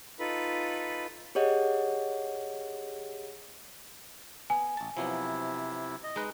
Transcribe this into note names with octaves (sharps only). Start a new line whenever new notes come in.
D#4 F4 A4 B4 B5
G4 G#4 C#5 D#5 F#5
B3 G#5
A1 A5
C3 F3 F#3 B3 E4
D#5
G#3 D#4 B4